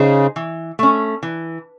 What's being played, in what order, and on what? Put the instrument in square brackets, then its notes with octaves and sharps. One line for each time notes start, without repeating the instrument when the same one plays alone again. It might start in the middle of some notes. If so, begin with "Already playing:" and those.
Already playing: [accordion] C#3 [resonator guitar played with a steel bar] D#4 G#4 C5
[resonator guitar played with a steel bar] E3
A3 C#4
E3